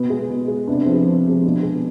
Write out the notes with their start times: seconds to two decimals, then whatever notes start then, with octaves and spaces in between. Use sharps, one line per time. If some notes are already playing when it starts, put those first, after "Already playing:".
Already playing: B2 B3
0.10 G#3
0.29 B2
0.48 G#3
0.67 C3 B3 D4
0.86 F3 G#3 C4
1.06 C3 C4
1.25 F3 G#3
1.43 B2 B3 D4
1.63 G#3